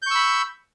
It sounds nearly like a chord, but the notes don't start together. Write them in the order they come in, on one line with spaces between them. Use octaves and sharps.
G6 C#6 E6 B5